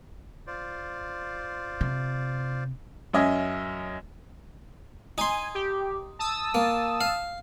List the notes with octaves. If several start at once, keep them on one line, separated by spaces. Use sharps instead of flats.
F4 C5 D5
C3
F#2 C#4 D#5 E5 G#5
D#4 G#5 C6
G4
A5 D#6 E6
A#3
F5